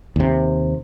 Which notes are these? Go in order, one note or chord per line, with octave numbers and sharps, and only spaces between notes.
D#2 C3